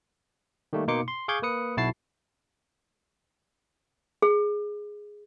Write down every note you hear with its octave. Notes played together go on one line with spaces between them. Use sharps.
D#3 G3 A3 A#3
B2 A#3 D#4 C6 D6 C#7
C6
G#4 F5 C#6 D6 G6 G#6
A#3 B4 D#6 C#7
B1 E4 F#4 A5 A6 C7
G#4